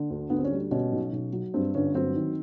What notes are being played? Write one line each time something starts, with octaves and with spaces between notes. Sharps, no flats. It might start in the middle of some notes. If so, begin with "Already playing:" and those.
Already playing: D3
D2
D2 B3
C4
C#4
G3
D4
B2 C#4
B1
B1
F#3
G2 C4
G1 C#4
F#3 C4
D#3